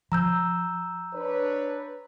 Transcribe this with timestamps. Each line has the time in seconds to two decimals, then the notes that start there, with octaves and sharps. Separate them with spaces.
0.12 F3 A#5 E6 G6
1.14 D4 B4 C#5